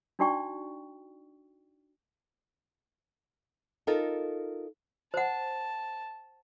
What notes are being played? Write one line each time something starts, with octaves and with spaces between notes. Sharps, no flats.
D4 D#4 F#4 D5 G5 C#6
D#4 F4 A4 A#4
C5 F#5 A5